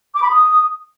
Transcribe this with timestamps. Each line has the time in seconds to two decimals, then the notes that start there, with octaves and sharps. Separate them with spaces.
0.16 D6
0.23 B5
0.30 D#6